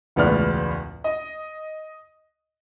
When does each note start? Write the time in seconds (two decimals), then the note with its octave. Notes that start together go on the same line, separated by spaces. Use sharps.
0.16 E1 C#2 A2 B3 D5 F6
1.04 D#5